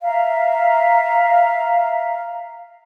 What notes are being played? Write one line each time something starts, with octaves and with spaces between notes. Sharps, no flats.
E5 F5 A#5